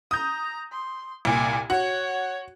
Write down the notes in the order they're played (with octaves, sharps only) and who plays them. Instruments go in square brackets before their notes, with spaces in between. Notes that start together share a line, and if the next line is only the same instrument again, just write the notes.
[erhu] A#5 [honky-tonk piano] D#6 G6
[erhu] C6
[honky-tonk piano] C2 A#2 [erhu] G#5
[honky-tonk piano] F#4 [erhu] C#5